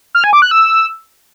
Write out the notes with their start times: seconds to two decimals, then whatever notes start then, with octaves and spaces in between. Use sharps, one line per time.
0.15 F6
0.24 G#5
0.33 D6
0.42 F#6
0.51 E6